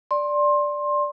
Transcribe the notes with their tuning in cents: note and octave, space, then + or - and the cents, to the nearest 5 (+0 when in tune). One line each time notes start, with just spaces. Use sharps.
D5 +0 C6 +20